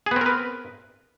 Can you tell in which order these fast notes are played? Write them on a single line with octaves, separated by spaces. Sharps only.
G#4 B3 C4 A#4 B4